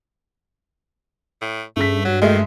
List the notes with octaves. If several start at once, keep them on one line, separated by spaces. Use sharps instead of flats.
A2
G2 A3 C#4 G#4 B6
F#3 F#4
D#3 G#3 A3